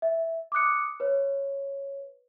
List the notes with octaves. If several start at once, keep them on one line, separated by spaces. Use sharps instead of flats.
E5
D6 D#6 F#6 C#7
B4 C#5